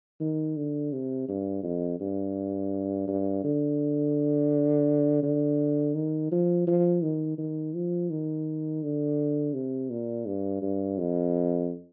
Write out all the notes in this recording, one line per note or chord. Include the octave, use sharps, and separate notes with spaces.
D#3
D3
C3
G2
F2
G2
G2
D3
D3
D#3
F3
F3
D#3
D#3
F3
D#3
D3
C3
A#2
G2
G2
F2